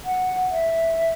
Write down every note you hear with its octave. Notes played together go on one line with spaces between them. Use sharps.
F#5
E5